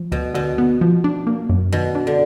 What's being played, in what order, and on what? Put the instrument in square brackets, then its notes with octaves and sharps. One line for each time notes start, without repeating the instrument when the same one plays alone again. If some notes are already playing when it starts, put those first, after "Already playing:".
Already playing: [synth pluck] F3
[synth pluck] D2 [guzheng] B2
[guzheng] B2 [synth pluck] D3
[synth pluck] B3
F3
D4
A#3
F#2
[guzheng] B2 [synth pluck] D#3
[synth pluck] D4
[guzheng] D3